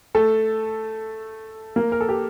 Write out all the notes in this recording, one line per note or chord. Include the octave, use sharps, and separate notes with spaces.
A3 A4
A#3 A#4
A#4
A4
G4